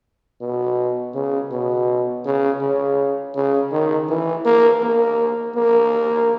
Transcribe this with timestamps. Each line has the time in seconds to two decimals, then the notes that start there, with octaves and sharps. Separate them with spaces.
0.41 B2
1.14 C#3
1.52 B2
2.25 C#3
2.62 C#3
3.35 C#3
3.72 D#3
4.09 E3
4.46 A#3
4.83 A#3
5.56 A#3